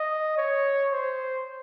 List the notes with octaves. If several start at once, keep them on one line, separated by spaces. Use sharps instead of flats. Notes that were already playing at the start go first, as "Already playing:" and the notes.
Already playing: D#5
C#5
C5